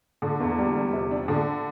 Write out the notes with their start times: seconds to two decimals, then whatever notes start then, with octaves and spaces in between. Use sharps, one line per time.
0.22 D3
0.40 E2
0.58 G3
0.76 G3
0.93 C3
1.11 D4
1.28 D3